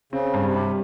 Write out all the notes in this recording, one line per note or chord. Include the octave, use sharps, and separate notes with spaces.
C#3 C4
G2
C3
G3